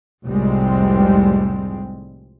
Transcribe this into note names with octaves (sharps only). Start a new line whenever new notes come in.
F1 C2 A2 G3 G#3 C4